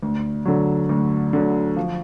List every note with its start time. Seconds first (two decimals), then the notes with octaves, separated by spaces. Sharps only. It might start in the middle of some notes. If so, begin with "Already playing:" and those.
0.03 D2
0.45 D3 F#3
0.89 D2
1.33 D3 F#3
1.77 F3